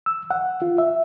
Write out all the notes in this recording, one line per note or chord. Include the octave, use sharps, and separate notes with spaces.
E6
F#5
F4
E5